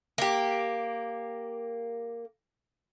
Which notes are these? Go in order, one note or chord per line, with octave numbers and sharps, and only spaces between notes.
A#3 G4